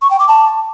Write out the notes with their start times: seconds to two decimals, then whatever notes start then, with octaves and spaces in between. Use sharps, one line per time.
0.02 C#6
0.11 G5
0.19 D6
0.28 A5